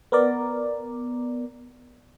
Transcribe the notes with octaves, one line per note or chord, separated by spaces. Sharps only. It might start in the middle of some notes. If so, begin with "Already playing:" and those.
B3 A#4 D5